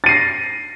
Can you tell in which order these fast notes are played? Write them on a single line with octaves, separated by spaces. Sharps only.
A6 D#7 C7 A#6